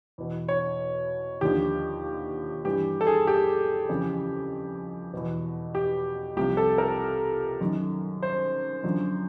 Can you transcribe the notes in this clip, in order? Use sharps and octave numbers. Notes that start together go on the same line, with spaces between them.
E2 B2
C#5
D#2 D3 F3 G4
G2 E3 G4
A4
G#4
G4
F2 C#3 E3
E2 B2
G4
C2 C3 F3 G4
A4
A#4
F#2 D#3
C5
F#2 D3 F3